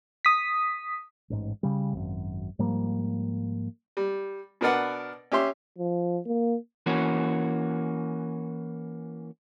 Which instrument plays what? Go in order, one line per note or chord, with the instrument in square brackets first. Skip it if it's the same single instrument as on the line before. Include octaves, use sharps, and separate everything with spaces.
[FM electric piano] D#6 B6
[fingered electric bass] A1 G#2
C#3 G3
G#1 F#2
G#2 F3 G3 A#3
[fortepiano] G3
B2 D4 A#4 B4 D5 F#5
C#4 G4 E5 C6
[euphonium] F3
A#3
[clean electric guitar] E3 A#3 C#4 F#4